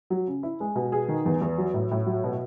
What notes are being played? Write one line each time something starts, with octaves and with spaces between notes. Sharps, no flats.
F#3
C#3
E4
G#3
B2
G#4
D#3
E2
E2
F#3
A2
A2
F#3
B2